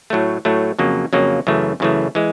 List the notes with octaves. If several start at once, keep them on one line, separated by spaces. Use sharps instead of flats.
A2 F#3 A3
A2 F#3 A3
F2 C#3 F#3 A#3
F2 C#3 F#3 A#3
F#2 C#3 E3 A3
F#2 C#3 E3 A3
E3 G#3